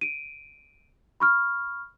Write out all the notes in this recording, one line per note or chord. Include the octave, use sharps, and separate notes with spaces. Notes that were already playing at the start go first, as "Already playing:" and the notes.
D7 D#7
B5 C#6 F6